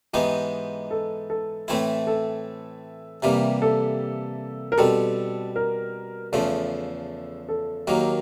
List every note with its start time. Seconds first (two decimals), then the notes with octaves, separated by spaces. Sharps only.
0.13 G#2 E3 G#3 B3 D#4 G4
0.91 A4
1.30 A4
1.68 A2 E3 A3 C4 E4
2.07 A4
3.23 C3 E3 G3 A#3
3.62 A4
4.72 A#4
4.78 B2 G3 C4 A4
5.56 A#4
6.32 E2 C#3 F3 A3 A4
7.49 A4
7.87 D#2 D#3 F#3 A#3